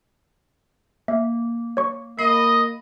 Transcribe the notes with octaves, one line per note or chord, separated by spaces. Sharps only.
A#3 E5
C#5 C#6
A#3 D#5 B5 C7